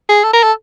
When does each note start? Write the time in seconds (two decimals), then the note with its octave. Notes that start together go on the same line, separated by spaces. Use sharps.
0.09 G#4
0.24 A4
0.33 A#4
0.43 A4